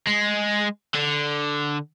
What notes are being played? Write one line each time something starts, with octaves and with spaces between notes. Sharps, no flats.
G#3
D3